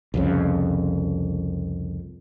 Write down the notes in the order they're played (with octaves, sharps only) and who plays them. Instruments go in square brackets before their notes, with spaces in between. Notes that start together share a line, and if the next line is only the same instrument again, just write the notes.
[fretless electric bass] C2 F2 C#3